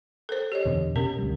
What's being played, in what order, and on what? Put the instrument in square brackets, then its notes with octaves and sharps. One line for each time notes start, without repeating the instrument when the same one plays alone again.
[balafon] A4 A#4 C5
G4 C#5 D#5
[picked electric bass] E2 B2 D3
[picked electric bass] B2 [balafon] C#4 G4 A#4
[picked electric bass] D2 G3